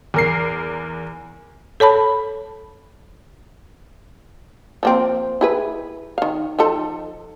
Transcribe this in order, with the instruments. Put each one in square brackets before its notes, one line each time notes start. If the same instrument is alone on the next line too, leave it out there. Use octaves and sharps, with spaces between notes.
[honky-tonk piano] E2 A#4 C7
[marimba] A4 C#5 A5 B5
[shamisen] F3 A#3 C4
E4 G#4 B4
D#3 F5
F3 D#4 A4